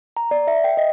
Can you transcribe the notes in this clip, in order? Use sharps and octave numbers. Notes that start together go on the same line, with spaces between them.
A#5
D5
E5
G5
D#5